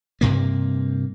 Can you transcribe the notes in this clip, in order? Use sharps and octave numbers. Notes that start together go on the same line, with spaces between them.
G2 C3 A#3